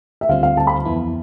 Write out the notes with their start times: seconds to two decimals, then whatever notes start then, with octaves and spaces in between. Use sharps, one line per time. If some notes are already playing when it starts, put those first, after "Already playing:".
0.21 E5
0.29 D2 D3 G3 C4 F4 F5
0.43 F5
0.57 A5
0.67 B5
0.85 F2 E3 B3 E4